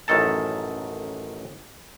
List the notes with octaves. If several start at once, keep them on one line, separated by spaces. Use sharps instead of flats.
A1 F#2 D#3 A4 A5